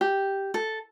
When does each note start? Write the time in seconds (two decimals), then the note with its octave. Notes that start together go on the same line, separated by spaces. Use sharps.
0.01 G4
0.54 A4